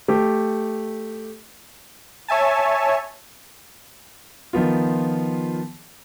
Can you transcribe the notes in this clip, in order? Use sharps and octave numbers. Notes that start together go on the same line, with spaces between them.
A3 G4
C#5 E5 G#5 A5
D#3 F3 B3 F4